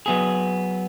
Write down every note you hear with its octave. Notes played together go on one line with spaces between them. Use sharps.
F#3 B3 G#4